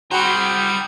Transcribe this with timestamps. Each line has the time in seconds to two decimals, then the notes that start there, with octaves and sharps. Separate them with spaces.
0.11 G3 F#4 G#4 C5 G5 A#5 B5